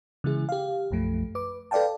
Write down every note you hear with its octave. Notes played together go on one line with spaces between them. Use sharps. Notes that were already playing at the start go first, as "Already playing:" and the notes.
C#3 E3 G#3 E4 G#4
G4 F5
B1 F#2 F3 A3
B4 D6
A4 B4 D5 F5 G5 A5